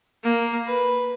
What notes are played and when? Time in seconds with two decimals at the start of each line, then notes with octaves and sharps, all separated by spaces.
0.23 A#3
0.66 B4